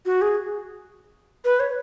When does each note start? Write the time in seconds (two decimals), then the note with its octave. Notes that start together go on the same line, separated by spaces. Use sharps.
0.06 F#4
0.22 G#4
1.45 B4
1.60 C#5